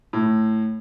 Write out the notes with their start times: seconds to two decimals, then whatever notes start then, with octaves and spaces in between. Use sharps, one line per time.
0.13 A2